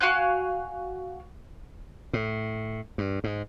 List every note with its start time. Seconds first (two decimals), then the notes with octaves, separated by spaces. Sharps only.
0.01 F#4 F5 G#5 F#6
2.13 A2
2.98 G2
3.24 G#2